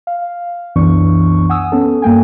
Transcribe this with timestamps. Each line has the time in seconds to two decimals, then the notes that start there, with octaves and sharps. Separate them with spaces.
0.07 F5
0.76 C2 F#2 E3 B3 D4 C#6
1.49 F#5 G#5 D#6 E6
1.72 B3 C#4 A4
2.02 G2 A#3 G5 G#5